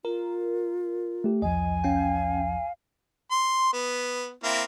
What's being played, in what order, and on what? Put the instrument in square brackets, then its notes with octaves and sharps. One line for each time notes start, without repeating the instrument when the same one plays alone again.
[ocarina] F4 [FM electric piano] A#4
[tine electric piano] A3 G4
[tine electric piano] B1 E2 F3 [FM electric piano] D#5 [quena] G#5
[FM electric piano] C#4 G5 [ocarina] F5
[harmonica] C6
B3
A#3 C4 E4